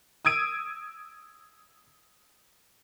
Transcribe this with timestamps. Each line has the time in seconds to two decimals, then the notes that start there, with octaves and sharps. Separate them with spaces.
0.25 D#6 E6 G#6 D7 D#7